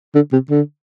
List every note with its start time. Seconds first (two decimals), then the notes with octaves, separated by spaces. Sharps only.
0.15 D3
0.33 C3
0.50 D3